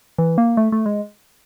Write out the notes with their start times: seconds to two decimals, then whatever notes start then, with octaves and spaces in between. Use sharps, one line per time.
0.18 E3
0.38 A#3
0.57 A3
0.72 A3
0.86 G#3